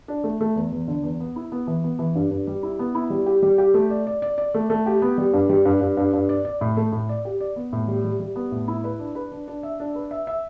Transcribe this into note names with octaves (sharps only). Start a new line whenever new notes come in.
D4
A3
A3
E2
E2
D3
E2
B3
E4
B3
E3
B3
E3
G2
G2
G3
E4
B3
E4
G3
G4
G3
G4
A3
D5
D5
D5
D5
A3
A3
G4
B3
G3
G2
G3
G2
G2
G2
G2
D5
D5
A2
A3
A2
D5
G4
D5
B3
A2
G3
G3
G3
B3
A2
E4
B4
D4
B4
D4
D4
E5
D4
B4
E5
E5